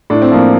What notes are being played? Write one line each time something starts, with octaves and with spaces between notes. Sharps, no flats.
A2 D4
C4
F3 A#3